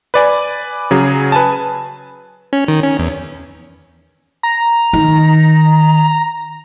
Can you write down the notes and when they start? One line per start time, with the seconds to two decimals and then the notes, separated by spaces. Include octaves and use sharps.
0.14 B4 D5 G#5
0.91 C#3 F#3 G#4 A#5
1.32 B4 G#5 A5
2.53 C#4
2.68 D#3
2.83 C#4
2.99 E2
4.43 A#5
4.93 D#3